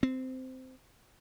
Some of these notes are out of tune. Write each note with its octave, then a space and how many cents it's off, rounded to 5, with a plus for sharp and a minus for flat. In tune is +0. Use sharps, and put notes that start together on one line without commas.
C4 -15